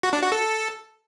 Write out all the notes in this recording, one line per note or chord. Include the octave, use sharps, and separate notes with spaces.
F#4
D4
F#4
A4